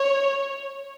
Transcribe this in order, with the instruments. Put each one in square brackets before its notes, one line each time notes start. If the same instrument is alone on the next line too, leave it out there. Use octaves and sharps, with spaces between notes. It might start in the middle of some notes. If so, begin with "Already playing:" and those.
Already playing: [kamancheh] C#5